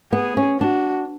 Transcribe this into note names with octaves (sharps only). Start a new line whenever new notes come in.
B3 G#4
C#4
D4 F#4